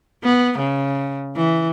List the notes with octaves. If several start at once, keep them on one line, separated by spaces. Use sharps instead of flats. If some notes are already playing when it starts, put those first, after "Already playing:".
B3
C#3
E3